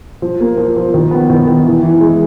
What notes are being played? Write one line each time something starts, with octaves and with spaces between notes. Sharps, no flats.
F3
A#3
F3
F3
D#3
B3
D#3
D#3
E3
E3
G#3